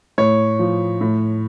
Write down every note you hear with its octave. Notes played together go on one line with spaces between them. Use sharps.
A2 C#5
F3
A2